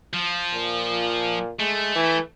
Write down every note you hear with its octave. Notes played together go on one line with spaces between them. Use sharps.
F3
A#2
G#3 A3
E3